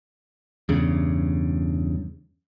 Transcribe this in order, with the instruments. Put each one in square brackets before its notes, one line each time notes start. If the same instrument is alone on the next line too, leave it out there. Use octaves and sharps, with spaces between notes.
[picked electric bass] E2 G2 C#3